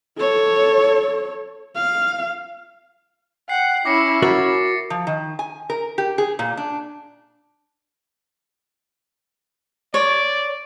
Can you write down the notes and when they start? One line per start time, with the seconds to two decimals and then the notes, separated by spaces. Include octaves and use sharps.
0.18 A4 C#5
1.76 F5
3.49 F#5 G5 C7
3.85 C#4 E4 D6 A#6 C#7
4.22 F#4 A#4 E5 A6
4.90 F3
5.07 D#3
5.39 G#5
5.70 A#4
5.98 G4
6.18 G#4
6.39 A#2
6.57 D4
9.94 C#5 D5